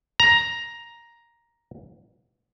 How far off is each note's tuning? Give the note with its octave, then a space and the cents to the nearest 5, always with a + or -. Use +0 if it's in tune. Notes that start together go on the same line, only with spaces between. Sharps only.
A#5 +10